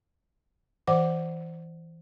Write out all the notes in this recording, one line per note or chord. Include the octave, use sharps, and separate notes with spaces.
E3 C5 F#5 D6